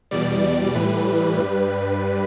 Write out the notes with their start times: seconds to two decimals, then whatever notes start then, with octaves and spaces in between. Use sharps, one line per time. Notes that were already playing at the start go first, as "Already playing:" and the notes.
0.11 E2 B2 G3 D5
0.43 D5
0.75 A2 E3 G3 B4
1.38 G2 G3